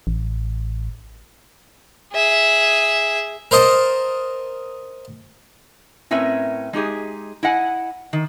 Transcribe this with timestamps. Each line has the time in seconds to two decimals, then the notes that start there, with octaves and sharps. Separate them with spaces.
0.07 A1
2.14 G#4 E5
3.51 A#4 C5 D#5 A5
6.11 A2 C4 C#4 A#4 B4 E5
6.73 G#3 D#4 G4 G#4
7.43 E4 D#5 F#5 G#5
8.13 D#3